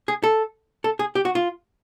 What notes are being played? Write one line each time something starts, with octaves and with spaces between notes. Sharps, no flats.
G#4
A4
A4
G#4
G4
F#4
F4